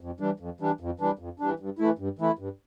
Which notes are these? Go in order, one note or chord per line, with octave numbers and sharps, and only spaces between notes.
F2
E3 G3 D4
F2
E3 G3 D4
F2
E3 G3 D4
F2
E3 G3 D4
G2
E3 A3 E4
G2
E3 A3 E4
G2